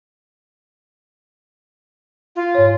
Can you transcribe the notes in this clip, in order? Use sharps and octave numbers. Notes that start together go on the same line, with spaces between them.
F4
G#2 C#5